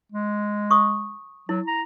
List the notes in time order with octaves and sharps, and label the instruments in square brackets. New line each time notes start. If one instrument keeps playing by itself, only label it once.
[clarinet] G#3
[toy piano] C#6 D#6
[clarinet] F#3 [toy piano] E4
[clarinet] A#5